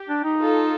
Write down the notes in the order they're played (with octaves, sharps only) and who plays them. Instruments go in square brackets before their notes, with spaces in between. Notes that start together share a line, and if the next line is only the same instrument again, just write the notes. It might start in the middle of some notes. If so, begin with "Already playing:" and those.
Already playing: [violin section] G4
[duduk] D4
D#4
[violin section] F4 A4